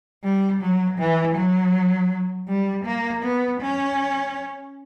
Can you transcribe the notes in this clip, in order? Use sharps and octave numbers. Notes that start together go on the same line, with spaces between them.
G3
F#3
E3
F#3
G3
A#3
B3
C#4